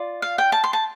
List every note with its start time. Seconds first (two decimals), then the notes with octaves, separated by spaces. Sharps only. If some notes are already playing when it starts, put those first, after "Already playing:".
Already playing: F4 D5
0.22 F5
0.38 G5
0.52 A5
0.64 C6
0.73 A5